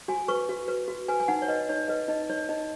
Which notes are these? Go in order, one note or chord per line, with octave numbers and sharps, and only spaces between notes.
F#4 G#5
B4 C#6
F#4
B4
F#4
B4 G#5
G#5
D#4 F#5
C#5
B4 D#5
D#4 C#5
B4 D#5
D#4 D#5
D#4 C#5
D#4 D#5